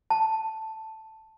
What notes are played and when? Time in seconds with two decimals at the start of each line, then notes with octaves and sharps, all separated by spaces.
0.10 A5